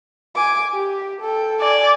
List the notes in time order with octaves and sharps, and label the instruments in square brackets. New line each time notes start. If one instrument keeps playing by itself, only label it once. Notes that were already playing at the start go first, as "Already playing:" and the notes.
[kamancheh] G#5 D6
G4
A4 G5
[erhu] D5 [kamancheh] G#5